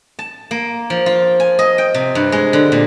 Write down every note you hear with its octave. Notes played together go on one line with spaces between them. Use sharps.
A5
A#3
F3
F4
G#5
D#5
G5
C3
G2
G#3
D3
A#2